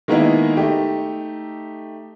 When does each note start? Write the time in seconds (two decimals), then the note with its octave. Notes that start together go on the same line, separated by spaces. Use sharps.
0.08 D#3 G#3 A#3 B3 D#4 E4
0.57 A3 D#4 G4